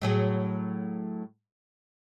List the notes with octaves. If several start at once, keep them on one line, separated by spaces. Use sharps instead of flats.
A2 F#3 G#4